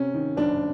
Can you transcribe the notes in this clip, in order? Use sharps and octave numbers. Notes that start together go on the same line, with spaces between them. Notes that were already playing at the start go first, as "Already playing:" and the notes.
Already playing: C3 C#4
D#3
F#1 D4